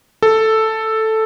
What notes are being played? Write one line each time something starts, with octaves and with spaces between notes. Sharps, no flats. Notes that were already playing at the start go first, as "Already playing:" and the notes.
A4